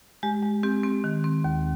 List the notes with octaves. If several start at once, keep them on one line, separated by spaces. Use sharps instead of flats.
G#3 G4
G#3
C4 G4
C4
D#3
C4
D#2